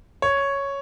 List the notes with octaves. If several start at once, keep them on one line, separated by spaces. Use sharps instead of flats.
C#5